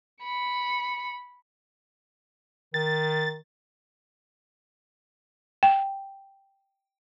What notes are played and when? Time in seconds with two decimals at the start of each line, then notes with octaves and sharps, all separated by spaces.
0.23 B5 C#7
2.74 D#3 A6
5.63 G5